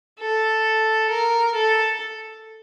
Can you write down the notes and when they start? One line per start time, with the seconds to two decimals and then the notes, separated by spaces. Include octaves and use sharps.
0.20 A4
1.10 A#4
1.55 A4